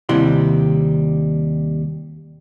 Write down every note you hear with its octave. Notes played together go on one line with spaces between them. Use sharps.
D#2 C3 G3 E4 F#5 C6